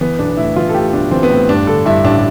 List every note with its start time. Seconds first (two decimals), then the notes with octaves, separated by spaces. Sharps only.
0.01 E3 B3
0.19 B1 D4
0.37 A2 E4
0.56 E3 F4
0.69 A4
0.74 A2 G4
0.93 B1 D4
1.11 E3 C4
1.23 B3
1.30 A2 C4
1.49 G2 D4
1.67 D3 A4
1.86 G2 E4
2.04 A1 D4